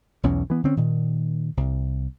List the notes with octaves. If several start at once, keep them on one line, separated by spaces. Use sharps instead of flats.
B1 E2 C#4
E3 B3
D3 C4 C#4
A#2 D#3
C2